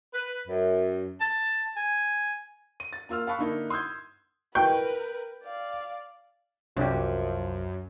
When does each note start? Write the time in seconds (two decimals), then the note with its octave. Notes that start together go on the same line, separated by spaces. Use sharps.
0.14 B4
0.48 F#2
1.20 A5
1.77 G#5
2.80 D#7
2.93 A6
3.09 A#3 F4 E6 F6
3.27 F5 A5 B5 C#6 F#6
3.39 D3 A#3 D#4 E4
3.70 C6 D#6 E6 G6 G#6
4.55 A#4 B4 G5
5.43 D5 F5
6.77 C2 F#2 F3 C#4 D4 G4